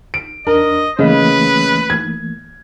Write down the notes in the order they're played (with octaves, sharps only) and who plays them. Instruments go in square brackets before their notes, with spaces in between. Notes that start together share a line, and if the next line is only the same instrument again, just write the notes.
[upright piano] D7
[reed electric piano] E2 D4 [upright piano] A#4 [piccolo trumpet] D#5
[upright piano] C#3 D#5 [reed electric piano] E3 A3 A#3 [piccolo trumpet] B4
[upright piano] G#6